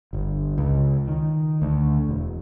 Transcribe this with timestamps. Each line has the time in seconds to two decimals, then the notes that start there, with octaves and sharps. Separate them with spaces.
0.13 G1
0.58 C#2
1.08 D#3
1.62 D2
2.09 E1